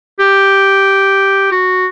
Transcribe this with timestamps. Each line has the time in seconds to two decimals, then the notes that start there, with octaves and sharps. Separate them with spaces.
0.19 G4
1.52 F#4